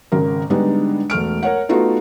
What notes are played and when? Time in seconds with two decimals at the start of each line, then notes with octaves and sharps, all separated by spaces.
0.12 G#1 C#3 A#4
0.50 D3 G3 G#3 B3 D4 D#4
1.10 E1 A3 F6 D7
1.43 A#4 C#5 F#5
1.69 A3 B3 D#4 F4 F#4 A4